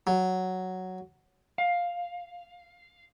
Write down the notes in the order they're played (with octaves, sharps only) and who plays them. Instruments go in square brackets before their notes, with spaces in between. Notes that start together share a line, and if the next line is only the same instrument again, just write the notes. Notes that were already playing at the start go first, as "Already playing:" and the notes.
[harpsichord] F#3
[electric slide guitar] F5